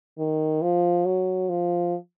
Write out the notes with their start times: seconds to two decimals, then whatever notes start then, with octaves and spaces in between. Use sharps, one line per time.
0.18 D#3
0.62 F3
1.05 F#3
1.49 F3